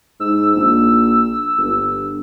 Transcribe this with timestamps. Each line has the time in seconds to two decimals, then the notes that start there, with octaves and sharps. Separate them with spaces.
0.20 G#2 E6
0.55 A#1
1.58 G1